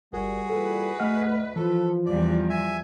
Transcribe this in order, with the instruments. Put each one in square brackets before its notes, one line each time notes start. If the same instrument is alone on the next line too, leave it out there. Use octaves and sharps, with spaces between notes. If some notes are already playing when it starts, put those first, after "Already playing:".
[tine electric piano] G1 A#4 [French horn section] G3 [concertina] F#4 G#4
[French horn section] A#2 E3 G3 [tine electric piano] A4 [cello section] B4
[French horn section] D2 D#5 [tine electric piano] A3 F#5 F6
[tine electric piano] E3 [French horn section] F3 [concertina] A4
[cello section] E2 G3 [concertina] D5
[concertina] E5 G#5